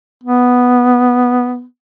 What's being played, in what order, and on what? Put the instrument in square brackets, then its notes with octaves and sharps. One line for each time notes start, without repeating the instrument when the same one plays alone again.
[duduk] B3